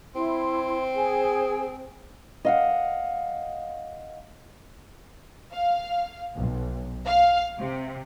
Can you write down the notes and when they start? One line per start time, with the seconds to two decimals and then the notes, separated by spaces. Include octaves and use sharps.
0.15 C4 E4 C6
0.94 G#4 G#5
2.45 D#5 F5 F#5
5.53 F5
6.37 B1
7.07 F5
7.58 C3